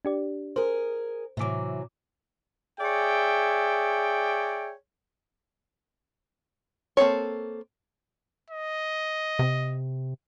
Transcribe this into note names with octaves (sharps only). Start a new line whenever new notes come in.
D4 G4 D5
G#4 A#4 C5
A2 C3 E3 F#3 D6
G#4 C#5 D5 E5 G5
A#3 C4 A4 C#5
D#5
C3